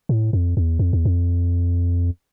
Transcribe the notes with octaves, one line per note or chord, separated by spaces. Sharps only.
A2
F2
E2
F2
E2
F2